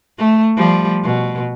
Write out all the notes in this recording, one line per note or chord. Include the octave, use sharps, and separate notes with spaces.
A3
F3 G3
B2